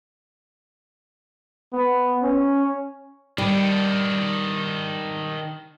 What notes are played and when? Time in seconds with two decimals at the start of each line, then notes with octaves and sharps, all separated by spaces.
1.73 B3
2.23 C#4
3.38 D#3 G3 D4